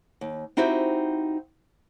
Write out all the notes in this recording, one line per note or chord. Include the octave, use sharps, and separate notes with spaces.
D#2
C4 D#4 E4 F#4 G4 C5